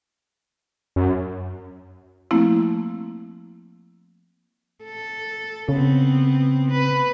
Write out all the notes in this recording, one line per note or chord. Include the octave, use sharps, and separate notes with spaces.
F#2
F3 A3 A#3 C4 E4
A4
C#3 B3 C4
B4